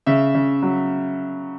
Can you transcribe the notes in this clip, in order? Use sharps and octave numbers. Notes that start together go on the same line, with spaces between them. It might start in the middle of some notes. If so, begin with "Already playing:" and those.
C#3 E5
C#3
F#3